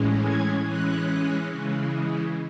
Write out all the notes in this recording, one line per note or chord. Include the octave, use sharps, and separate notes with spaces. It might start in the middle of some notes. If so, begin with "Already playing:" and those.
Already playing: A2 E3 G#3 C#4
G#6
E3 G#3 C#4 F#6
C#3 E3 G#3